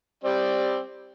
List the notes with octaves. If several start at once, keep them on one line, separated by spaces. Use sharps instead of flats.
G3 C4 D5